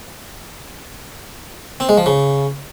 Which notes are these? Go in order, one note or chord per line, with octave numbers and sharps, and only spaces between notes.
C4
G#3
F3
C#3